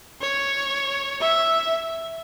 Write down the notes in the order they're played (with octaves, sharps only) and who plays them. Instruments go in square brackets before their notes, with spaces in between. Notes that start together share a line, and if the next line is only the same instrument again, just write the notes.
[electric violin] C#5
E5